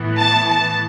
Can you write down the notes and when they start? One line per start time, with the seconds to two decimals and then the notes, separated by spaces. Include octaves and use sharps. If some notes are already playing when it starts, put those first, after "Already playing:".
Already playing: A2 E3 B3
0.18 A5
0.48 A5